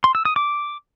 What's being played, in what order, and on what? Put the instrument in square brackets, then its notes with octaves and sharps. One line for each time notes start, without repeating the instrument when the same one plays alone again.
[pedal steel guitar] C6
E6
D#6
D6